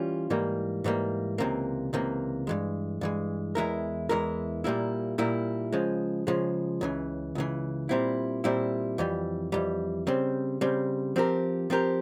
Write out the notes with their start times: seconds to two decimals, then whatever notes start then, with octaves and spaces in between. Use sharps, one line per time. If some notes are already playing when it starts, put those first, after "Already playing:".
Already playing: E3 G3 C#4 F4
0.30 G#2 E3 G3 A#3
0.84 G#2 E3 G3 A#3
1.38 C#2 C3 E3 A#3
1.93 C#2 C3 E3 A#3
2.47 G2 E3 G#3
3.01 G2 E3 G#3
3.55 E2 E3 G#3 E4 A#4
4.09 E2 E3 G#3 E4 A#4
4.64 A#2 G3 A#3 E4
5.18 A#2 G3 A#3 E4
5.72 C#3 F3 G#3
6.27 C#3 F3 G#3
6.81 C#2 C#3 E3
7.35 C#2 C#3 E3
7.89 A#2 G3 C4 E4
8.44 A#2 G3 C4 E4
8.98 F2 E3 G3
9.52 F2 E3 G3
10.07 C#3 G3 C4
10.61 C#3 G3 C4
11.16 F3 C4 G4 A#4
11.70 F3 C4 G4 A#4